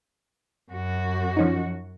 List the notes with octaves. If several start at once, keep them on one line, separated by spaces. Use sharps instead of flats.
F#2 F#4
F3 C#4 D#4